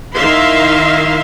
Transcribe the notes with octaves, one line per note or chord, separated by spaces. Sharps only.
D#3 E4 E5 F5 C6